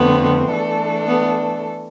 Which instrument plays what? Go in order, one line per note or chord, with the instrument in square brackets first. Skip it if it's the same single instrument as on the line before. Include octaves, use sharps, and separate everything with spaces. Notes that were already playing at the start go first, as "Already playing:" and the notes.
Already playing: [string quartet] F2 D3 A3 C4 [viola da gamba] B3
[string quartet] E3 A3 D4 A4
[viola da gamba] B3